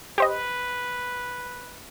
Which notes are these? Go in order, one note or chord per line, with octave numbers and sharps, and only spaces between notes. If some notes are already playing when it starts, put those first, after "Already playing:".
G4 B4 C5 D#5